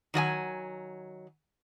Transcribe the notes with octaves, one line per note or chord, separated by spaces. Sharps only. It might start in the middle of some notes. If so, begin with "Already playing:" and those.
D#3 F#3 D#5 G#5